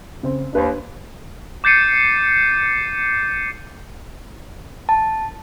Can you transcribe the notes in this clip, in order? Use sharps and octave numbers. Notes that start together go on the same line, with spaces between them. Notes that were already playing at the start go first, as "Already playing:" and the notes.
C#3 C4
D#2 D4 B4 C5
D6 G6 A6 C7 C#7 D#7
A5